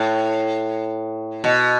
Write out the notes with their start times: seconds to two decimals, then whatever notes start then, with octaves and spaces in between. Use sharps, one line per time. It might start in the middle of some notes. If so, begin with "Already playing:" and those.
Already playing: A2
1.44 B2